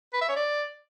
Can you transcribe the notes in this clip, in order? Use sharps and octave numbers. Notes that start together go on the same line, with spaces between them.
B4
E5
C#5
D5